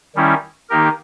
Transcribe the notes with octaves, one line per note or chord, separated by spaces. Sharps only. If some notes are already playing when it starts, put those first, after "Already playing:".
D#3 G3 C#4 E4
D#3 A#3 D#4 G4 A#4